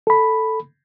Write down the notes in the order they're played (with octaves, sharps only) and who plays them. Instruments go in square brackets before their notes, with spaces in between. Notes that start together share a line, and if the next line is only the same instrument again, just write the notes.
[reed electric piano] A4 B5